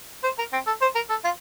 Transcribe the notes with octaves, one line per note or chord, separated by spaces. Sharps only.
C5
A#4
C4
A4
C5
A#4
A4
F4